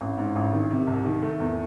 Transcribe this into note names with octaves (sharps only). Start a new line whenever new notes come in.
A1
G#2
A1
D#3
C3
C2
D#3
A3
E2